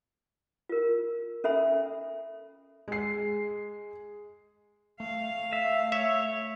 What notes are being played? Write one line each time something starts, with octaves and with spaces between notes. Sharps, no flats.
F4 A#4
C#4 A4 E5 B5
G#3 C7
A3 F5
E5
C#5 E5